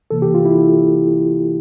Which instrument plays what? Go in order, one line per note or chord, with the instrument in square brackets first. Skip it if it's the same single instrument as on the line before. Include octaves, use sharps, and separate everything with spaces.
[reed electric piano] C2 C3 E3 A#3 A4
G4
F4
E4